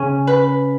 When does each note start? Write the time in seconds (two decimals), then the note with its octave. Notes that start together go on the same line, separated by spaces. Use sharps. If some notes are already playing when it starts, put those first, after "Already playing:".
Already playing: C#3 C#4
0.27 B4